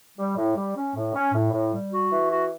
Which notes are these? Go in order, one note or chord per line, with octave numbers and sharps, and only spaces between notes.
G3
A2
G3
C#4
A2
C#4
A2
A2
G3
F#4
E3
F#4